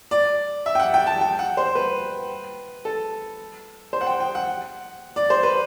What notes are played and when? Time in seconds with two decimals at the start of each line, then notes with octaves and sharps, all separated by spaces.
0.11 D5
0.66 E5
0.75 G5
0.80 F#5
0.94 G5
1.07 A5
1.21 G5
1.39 F#5
1.57 C5
1.75 B4
2.85 A4
3.93 C5
4.01 F#5
4.07 G5
4.20 G5
4.35 F#5
5.16 D5
5.30 C5
5.43 B4